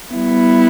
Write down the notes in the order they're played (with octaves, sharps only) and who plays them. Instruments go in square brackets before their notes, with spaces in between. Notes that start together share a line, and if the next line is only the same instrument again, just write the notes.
[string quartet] G3 B3 E4